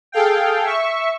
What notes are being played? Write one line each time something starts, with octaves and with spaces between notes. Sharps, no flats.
G#4 A4 F5 G5
E5 C#6